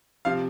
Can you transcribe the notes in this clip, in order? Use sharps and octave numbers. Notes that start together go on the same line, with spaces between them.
C3 F3 F5